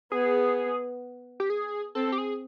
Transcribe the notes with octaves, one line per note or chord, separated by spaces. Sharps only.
B3 G#4
G4
G#4
C4 A4
G4
G#4